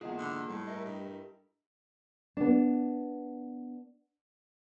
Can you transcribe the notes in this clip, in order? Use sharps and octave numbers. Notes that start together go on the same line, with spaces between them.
E2 G#2 A#3 F4 G#4 D#5 F#5
D3
A2 G3 A4
A3 E4 A#4 D#5
G2
B3 D4